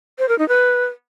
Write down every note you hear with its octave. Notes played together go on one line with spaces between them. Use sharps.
C5
A#4
D#4
B4